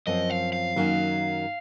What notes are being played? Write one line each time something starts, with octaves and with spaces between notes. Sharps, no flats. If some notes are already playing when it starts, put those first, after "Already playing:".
F#2 F3 C4 D#5
F5
F5
F#2 D#3 F#3 A#3 C#4